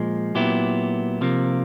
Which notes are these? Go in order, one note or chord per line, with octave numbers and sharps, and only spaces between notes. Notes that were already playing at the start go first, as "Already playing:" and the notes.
Already playing: A#2 F3 G#3
A#2 F#3 B3 E4 G4
C3 F3 A#3